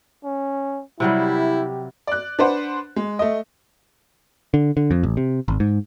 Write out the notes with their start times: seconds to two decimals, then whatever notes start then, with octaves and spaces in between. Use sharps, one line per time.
0.24 C#4
1.00 C3 F#3 G3 E4 G4
2.07 D5 F#6
2.39 D4 B4 C5 F#5
2.96 G#3
3.19 A3 D#5
4.54 D3
4.77 D3
4.91 F2
5.03 A1
5.17 C3
5.48 G#1
5.60 G#2